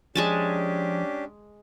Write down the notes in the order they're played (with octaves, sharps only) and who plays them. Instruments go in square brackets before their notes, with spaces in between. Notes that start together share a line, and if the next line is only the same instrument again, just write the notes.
[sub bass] F3 [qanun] G#3 G#5 A5 [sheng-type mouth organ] C#4 D4 G4